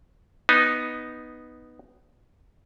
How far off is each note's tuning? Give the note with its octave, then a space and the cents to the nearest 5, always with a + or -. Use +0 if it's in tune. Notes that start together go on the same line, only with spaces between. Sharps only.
B3 +0 D#4 +0